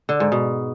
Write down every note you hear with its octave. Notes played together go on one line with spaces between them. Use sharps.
D3
G#2
B2